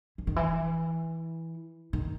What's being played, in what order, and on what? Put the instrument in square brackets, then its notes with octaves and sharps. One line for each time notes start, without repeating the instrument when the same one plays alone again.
[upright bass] E3
D#3
E3
D#3